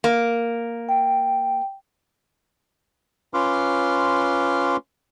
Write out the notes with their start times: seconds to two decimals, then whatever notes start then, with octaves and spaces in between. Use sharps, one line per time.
0.04 A#3
0.89 G5
3.34 C#4 F4 B4 C6 D6 F6